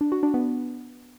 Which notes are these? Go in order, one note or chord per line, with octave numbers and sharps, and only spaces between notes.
D4
F#4
D4
B3